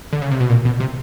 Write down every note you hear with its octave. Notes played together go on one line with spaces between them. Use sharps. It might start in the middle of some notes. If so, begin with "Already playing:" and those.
D3
C#3
C3
B2
A#2
B2
C3